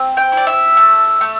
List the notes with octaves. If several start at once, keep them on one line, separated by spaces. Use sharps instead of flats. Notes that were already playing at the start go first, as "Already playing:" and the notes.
Already playing: C4
G5
E4
D5
E5
A3
A3